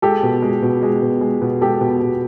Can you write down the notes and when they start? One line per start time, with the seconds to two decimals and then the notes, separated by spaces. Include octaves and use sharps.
0.02 G#3 G4 A4
0.23 B2
0.42 G#3
0.62 B2
0.83 G#3
1.02 B2
1.21 G#3
1.42 B2
1.61 G#3 G4 A4
1.81 B2
2.02 B2